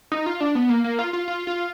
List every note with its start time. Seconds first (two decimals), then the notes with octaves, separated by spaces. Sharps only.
0.12 D#4
0.26 F4
0.40 D4
0.55 B3
0.69 A#3
0.84 A#3
0.99 F4
1.13 F4
1.28 F4
1.47 F4